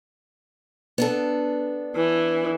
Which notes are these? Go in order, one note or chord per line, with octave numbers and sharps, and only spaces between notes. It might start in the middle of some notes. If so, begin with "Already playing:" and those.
B3 D4 A4
E3